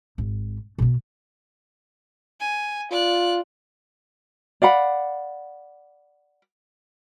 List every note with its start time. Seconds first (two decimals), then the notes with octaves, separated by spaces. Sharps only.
0.18 G#1
0.78 B2 B3
2.41 G#5
2.91 F4 D5 F#6
4.62 D5 F5 F#5 B5